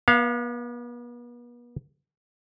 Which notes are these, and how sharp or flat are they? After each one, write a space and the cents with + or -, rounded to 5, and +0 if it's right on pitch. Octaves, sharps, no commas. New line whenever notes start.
B3 -40 F5 +0